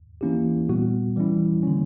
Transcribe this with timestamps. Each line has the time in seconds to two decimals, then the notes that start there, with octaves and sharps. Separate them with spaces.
0.21 E3 A#3 C#4 E4 G4
0.69 A#2 G3 B3 F#4
1.16 E3 G3 C#4 E4
1.63 D3 G3 A#3 C#4